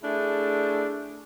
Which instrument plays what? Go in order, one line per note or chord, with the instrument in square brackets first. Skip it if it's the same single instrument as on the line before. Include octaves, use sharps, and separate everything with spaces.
[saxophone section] A3 D4 E4 G#4